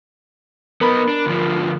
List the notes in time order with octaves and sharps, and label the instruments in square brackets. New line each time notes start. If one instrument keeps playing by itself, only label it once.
[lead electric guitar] B3 D#4 [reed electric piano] A#4 B5
[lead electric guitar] D4
D2 F3